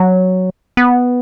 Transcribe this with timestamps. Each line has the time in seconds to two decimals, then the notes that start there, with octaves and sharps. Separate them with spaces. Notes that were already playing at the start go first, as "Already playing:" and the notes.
Already playing: F#3
0.77 B3